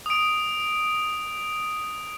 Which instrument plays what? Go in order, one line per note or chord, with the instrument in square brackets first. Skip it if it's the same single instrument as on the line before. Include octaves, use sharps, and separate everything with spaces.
[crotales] D#6 D7